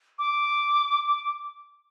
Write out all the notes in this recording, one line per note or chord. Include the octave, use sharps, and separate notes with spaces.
D6